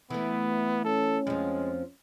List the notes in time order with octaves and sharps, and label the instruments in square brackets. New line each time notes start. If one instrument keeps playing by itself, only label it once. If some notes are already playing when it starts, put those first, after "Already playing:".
[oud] E3 A3 [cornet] B3
[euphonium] C#4 [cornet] A4
[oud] F2 F3 [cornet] G#3